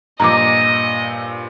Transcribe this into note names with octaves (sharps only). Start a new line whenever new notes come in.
G2 A#2 F3 D#5 A#5 D6